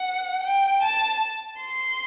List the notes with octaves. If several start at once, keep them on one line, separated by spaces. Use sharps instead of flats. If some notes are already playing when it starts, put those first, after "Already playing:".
Already playing: F#5
G5
A5
C6